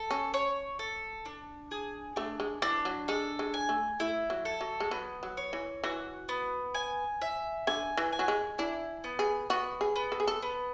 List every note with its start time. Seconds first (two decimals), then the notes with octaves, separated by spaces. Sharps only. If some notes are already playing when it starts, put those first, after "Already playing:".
Already playing: A4
0.11 C#4
0.34 C#5
0.79 A4
1.25 D4
1.71 G#4
2.16 A3 D4
2.40 G#3
2.62 E3 D4
2.85 F#3
3.08 G#3 A4
3.39 G#3
3.54 G#5
3.69 A3
4.00 A3 E4
4.30 F#3
4.45 A4
4.61 F#3
4.80 G#3
4.91 F#3 B3
5.23 F#3
5.37 C#5
5.53 E3
5.84 E3 F#4
6.29 B3
6.74 G#5
7.22 E5
7.67 D3 G#5
7.97 E3
8.12 G#5
8.19 F#3
8.28 G#3
8.58 D4 E4
9.04 B3
9.19 G#4
9.50 B3 F#4
9.81 G#4
9.96 B3
10.12 A4
10.20 G#4
10.27 A4
10.42 B3